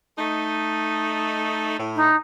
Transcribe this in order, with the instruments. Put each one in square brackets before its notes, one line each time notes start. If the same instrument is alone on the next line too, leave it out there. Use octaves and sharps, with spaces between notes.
[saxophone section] A3 D#4
A2
[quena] D#4